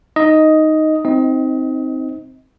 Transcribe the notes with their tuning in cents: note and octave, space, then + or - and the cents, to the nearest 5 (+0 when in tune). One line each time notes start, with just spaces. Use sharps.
D#4 +0 D#5 +5
C4 +0 D#4 +10 D#5 +30